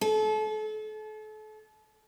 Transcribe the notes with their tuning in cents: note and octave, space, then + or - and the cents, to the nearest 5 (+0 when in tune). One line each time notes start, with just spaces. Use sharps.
A4 -35